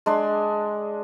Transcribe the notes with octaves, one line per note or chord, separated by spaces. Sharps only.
G#3 D4 C6